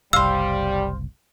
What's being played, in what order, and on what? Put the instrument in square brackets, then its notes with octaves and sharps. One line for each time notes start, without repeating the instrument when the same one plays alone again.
[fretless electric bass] F#1 C2 [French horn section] G3 [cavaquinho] C5 F5 [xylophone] E6